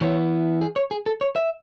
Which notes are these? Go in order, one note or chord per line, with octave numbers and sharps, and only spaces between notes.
E3 B3 E4 C#5
G#4
C#5
G#4
A4
C#5
E5